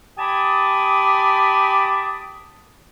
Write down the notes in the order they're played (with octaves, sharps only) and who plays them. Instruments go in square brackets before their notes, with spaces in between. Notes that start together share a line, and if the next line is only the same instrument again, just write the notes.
[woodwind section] G4 G#5 A5 B5 D6 D#6